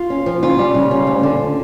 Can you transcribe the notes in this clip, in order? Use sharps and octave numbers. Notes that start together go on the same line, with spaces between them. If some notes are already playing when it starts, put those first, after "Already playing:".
Already playing: F4
C#4
F3
C#3 F4
G3
C#3
C#4
D2
D3